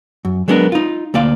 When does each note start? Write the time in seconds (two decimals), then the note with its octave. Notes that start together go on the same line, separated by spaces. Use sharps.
0.25 F#2
0.48 F#3 G#3 B3 D4 A4 A#4
0.72 D#4 F4
1.14 D2 A#3 D5 F5